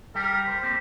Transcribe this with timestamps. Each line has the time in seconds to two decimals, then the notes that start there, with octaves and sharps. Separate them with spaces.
0.15 G3 G4 A#4
0.47 C5
0.63 A#3 C4 G4